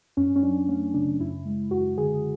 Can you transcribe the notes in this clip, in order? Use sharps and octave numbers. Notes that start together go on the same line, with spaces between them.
F#2 C#4
C#4
F#3 D4
A3 C#4
C#3 D4
F#2 E4
G#3
F#2 F#4
D3 G#4